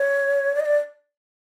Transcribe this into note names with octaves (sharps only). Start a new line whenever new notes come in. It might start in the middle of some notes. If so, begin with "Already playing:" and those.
Already playing: C#5
D5
D#5
D5